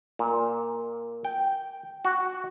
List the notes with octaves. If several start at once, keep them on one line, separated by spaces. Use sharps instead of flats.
A#2
G5
F#4